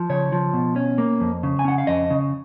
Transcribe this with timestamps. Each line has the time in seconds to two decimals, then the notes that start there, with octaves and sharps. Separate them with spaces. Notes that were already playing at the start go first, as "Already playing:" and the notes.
Already playing: F3
0.09 C#3 C#5
0.32 F3
0.53 B2
0.76 C#4
0.98 A#3
1.20 F2
1.43 C#3
1.59 G#5
1.65 C#4 F#5
1.78 F5
1.87 F2 D#5
2.10 C#3